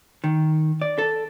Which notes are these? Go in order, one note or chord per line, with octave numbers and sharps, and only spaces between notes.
D#3
D5
A4